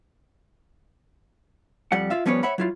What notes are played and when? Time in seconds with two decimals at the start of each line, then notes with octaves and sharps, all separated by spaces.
1.92 F2 G3 F#5
2.10 F4 E5 F5
2.26 F3 G3 B3 C#4 B4 C#5
2.43 C#5 E5 F#5 B5
2.58 F#3 E4 F4